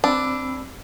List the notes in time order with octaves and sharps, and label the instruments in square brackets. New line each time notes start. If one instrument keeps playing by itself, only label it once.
[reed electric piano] C4 B5 E6 [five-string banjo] D4